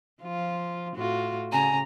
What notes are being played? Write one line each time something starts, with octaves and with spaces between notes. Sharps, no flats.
F3 F4
A2 F4 F#4
C#3 G#5 A#5